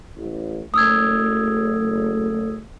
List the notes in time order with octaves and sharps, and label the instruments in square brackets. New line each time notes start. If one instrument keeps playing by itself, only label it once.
[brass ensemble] A1
[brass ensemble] F#1 A3 [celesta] D#6 E6 G#6